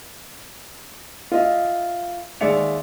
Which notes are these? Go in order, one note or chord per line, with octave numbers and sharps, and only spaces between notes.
F4 D#5 E5
D#2 G#3 D5 E5 C#7 F7